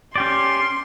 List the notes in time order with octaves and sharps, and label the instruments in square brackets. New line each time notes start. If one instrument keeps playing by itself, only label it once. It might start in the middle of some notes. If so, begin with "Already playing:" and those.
[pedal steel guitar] C#4 G4 D5 [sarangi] C6